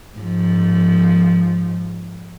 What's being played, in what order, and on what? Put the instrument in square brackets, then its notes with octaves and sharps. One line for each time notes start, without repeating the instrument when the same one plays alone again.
[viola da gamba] G#2 F3